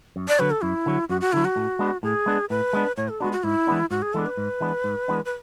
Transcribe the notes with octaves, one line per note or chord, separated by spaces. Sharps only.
F#2
D5
D3 F#3 B4
A4
F#2 E4
D3 F#3
F#2 F#4
F#4
D3 F#3 E4
F#4
A2
G#3 B3 D4
A2 G#4
G#3 B3 D4
A2 B4
G#3 B3 D4
A2 C#5
A4
G#3 B3 D4 F#4
F#4
G#2 E4
E3 G#3 B3 D4
G#2 F#4
G#4
E3 G#3 B3 D4 A4
B4
G#2
E3 G#3 B3 D4
G#2
E3 G#3 B3 D4
B4